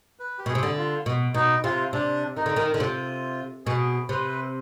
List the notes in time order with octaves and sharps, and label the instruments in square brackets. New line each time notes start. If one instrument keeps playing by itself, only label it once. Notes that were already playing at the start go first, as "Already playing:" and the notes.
[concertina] B4
G4
[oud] B2 [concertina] G#4
[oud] C3
D3
[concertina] F4
[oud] B2
[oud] B2 [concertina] D#4
[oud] C3 [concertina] F4
[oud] C3 [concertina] D4
[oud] D#3 [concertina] D#4
[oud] D3
D#3
D3
[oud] C3 [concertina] F4
[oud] B2 [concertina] G#4
[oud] C3 [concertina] B4